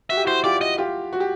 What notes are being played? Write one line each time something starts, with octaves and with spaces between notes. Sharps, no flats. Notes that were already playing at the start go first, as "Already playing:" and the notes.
F#4 E5
G4
E4 F#4 C5
F4 G4 D5
D#5
F4 G4
F#4
G4